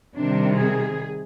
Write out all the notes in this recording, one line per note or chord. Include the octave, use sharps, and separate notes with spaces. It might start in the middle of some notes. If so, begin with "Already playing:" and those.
C3 D#3 G3 D4
G#4